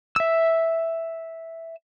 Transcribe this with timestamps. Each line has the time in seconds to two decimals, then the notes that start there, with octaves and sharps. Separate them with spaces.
0.16 E5 E6